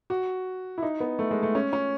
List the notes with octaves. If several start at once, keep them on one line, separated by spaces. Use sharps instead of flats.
F#4
E4
D#4
B3
A3
G#3
A3
C#4
C#4